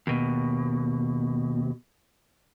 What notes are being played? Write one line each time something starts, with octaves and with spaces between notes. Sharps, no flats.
D#2 B2